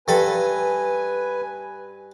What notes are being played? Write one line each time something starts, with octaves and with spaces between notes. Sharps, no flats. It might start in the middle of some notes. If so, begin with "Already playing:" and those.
G2 A4 B4 G#5 B5